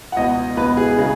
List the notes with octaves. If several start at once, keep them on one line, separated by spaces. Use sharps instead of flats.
F#5
C#2 B2 B3 D#5
C#2 B2 B3 B4
G#4
C#3 G#3 B3